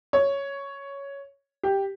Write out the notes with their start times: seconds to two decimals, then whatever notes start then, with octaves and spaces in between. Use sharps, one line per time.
0.13 C#5
1.63 G4